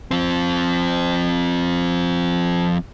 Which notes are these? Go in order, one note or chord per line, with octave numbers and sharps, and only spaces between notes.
F3 C4